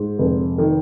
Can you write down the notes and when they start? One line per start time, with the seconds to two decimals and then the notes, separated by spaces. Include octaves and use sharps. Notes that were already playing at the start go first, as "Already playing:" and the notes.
Already playing: G#2
0.19 F1
0.58 D#3